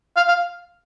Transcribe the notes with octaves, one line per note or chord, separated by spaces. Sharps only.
F5
F5